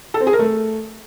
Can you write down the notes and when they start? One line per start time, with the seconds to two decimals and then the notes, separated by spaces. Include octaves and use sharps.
0.14 A4
0.20 C4
0.27 G#4
0.33 A#4
0.39 A3